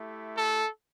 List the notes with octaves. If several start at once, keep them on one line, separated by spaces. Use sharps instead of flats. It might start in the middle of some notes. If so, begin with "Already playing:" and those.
Already playing: A3 E4 G4
A4